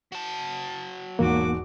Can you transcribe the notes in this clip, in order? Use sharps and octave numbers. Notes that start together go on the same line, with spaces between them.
F#3 A5
E1 E2 G#2 A#3 F#4 D6